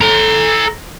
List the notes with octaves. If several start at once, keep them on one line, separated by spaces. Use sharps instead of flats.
A4 A#5